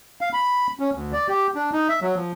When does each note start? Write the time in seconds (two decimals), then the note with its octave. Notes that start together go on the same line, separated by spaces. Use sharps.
0.21 F5
0.33 B5
0.80 C#4
0.94 D2
1.13 D5
1.28 G4
1.55 D4
1.73 D#4
1.89 E5
2.02 F#3
2.16 F3